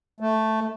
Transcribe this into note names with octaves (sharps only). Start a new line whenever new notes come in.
A3